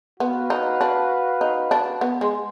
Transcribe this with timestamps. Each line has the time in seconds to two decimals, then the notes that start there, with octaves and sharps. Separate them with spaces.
0.20 B3 F#4 B4 F5
0.50 D#4
0.81 D4
1.41 D#4
1.71 D4
2.01 B3
2.21 G#3